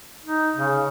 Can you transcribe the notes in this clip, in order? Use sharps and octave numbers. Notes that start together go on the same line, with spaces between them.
D#4
C#3